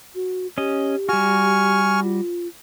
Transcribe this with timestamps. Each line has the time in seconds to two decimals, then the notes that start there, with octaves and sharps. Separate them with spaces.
0.15 F#4
0.58 C#4 G4 D#5
1.09 G3 F#4 G#5 C#6 F6
2.02 F4